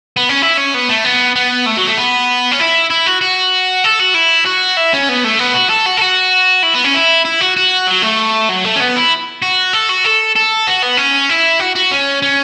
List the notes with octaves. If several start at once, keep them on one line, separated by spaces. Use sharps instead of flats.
B3
C#4
E4
C#4
B3
A3
B3
B3
A3
F#3
A3
B3
C#4
E4
E4
F#4
F#4
A4
F#4
E4
F#4
E4
C#4
B3
A3
B3
F#4
A4
F#4
A4
F#4
E4
B3
C#4
E4
E4
F#4
F#4
F#3
A3
F#3
A3
C#4
B3
E4
F#4
A4
F#4
A4
A4
F#4
B3
C#4
E4
F#4
F#4
C#4
C#4